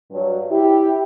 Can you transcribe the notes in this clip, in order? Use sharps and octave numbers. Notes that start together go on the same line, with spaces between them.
G2 F#3
E4 G4